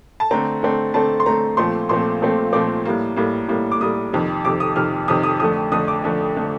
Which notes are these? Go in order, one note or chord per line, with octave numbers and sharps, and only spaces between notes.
A5
D3 A3 C4 A#5
D3 A3 C4
D3 A3 C4 A5
C6
D3 A3 C4 A#5
A#2 F3 A3 C4 C6
A#2 F3 A3 C4 C6
A#2 F3 A3 C4
A#2 F3 A3 C4 D6
A2 G3 A#3
A2 G3 A#3
A2 G3 A#3
D6
A2 G3 A#3 D#6
F2 C3 D#3
F2 C3 D#3 D6
D#6
F2 C3 D#3 F6
F2 C3 D#3 D#6
D#6
F2 D3 A3 D#6
F2 D3 A3 D#6
D6
F2 D3 A3
D3 A3